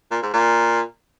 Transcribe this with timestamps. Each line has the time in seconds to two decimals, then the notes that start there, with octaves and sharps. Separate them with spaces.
0.11 A#2
0.22 G#2
0.33 A#2